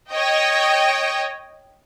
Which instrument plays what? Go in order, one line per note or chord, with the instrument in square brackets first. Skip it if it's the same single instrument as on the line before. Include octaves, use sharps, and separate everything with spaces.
[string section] C#5 D#5 G5